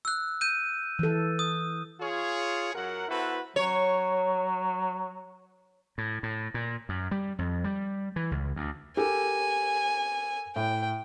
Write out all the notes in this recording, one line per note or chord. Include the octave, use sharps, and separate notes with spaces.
E6 F#6
G6 D#7
E3 A4
D#6
F4 G#4 C#5
F#2 F#3 A#4 F#5
B3 E4 F#4 A4 B4 C5
F#3 C#5
A2
A2
A#2
F#2
G3
F2
G3
E3
C#2
D2
G4 A4 A#4 G#5
A2 G5